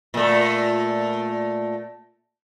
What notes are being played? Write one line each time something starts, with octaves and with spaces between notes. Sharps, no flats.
A#2 A3